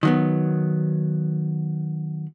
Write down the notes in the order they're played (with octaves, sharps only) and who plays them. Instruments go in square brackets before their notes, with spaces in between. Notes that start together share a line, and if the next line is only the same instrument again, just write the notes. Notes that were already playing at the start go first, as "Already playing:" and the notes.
[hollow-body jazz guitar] D#3 F#3 B3